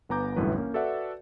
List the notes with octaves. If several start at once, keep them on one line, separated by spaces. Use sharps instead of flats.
G1 B3 G#5 A#5 D6 G6
G1 C2 F#2 A2 E3 B4
A#3 C#4
F#4 A4 B4 D5 E5 F#5